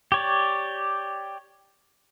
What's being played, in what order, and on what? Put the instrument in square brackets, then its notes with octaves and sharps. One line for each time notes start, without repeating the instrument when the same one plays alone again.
[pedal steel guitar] G4 C#5 D5